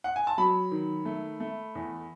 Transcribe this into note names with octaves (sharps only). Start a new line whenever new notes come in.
F#5
G#5
A5
F#3 B5
D#3
A3
A3
E2